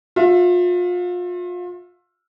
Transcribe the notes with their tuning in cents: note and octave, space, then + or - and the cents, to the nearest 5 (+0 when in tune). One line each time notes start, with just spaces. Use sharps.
F4 +35 E5 +15